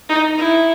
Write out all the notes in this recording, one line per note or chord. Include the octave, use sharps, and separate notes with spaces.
D#4
E4